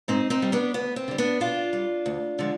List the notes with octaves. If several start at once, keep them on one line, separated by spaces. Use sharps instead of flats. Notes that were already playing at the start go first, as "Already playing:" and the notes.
G#2 C4 D#4
C4 D#4
G3
B3 D4
D2 B3
C4
D3 G3
B3 D4
B2 D4 F4
G3
D2
D3 F3 G#3